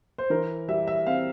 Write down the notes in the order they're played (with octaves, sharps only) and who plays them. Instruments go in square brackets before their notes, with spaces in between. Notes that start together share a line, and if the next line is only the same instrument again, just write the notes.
[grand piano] C5
E3 A#4
G3 E5
E5
C4 F5